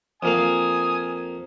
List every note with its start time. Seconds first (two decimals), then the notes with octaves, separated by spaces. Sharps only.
0.23 F2 A#3 F5 G#5 D#6